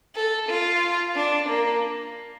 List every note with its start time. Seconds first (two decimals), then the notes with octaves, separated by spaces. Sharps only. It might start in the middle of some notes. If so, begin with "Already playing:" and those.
0.15 A4
0.49 F4
1.16 D4
1.49 A#3